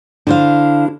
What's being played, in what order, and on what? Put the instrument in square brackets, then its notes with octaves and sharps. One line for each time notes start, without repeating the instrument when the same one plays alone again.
[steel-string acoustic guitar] D3 C5 F5 [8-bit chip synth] D4 E4